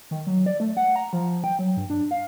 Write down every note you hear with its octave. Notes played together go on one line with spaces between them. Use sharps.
D#3
F#3
D5
A3
F#5
A#5
F3
G5
F#3
G2
D4
F5